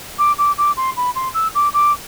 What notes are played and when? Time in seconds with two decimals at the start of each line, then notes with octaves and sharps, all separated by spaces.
0.18 D6
0.38 D6
0.58 D6
0.77 C6
0.97 B5
1.15 C6
1.34 E6
1.55 D6
1.74 D6